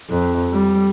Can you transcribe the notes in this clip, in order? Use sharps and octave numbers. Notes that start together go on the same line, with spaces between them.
F2
G3